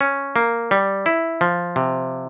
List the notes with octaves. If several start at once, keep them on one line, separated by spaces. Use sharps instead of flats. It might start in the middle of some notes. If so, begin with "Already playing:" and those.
C#4
A#3
G3
E4
F3
C3